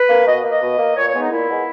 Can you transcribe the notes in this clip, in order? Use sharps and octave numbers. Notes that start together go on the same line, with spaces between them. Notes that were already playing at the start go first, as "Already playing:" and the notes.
Already playing: B4
A#3
B2 D#5
A#3
D#5
B2
A#3
A#2 C#5
C#5
G#3 B3
D#4
A#2 E4
G#3 B3